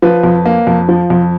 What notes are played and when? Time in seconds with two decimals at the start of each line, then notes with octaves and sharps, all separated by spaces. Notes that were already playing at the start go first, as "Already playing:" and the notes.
0.02 F3 B4
0.24 F2
0.45 A#3
0.67 F2
0.89 F3
1.10 F2